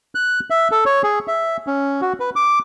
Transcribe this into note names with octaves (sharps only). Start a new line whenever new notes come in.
F#6
E5
A4
C#5
G#4
E5
C#4
F#4
B4
D6